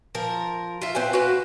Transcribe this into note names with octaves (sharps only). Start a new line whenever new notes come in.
F3 A#4
F4 E5
C4 B4 F5 G#5
F#4 B4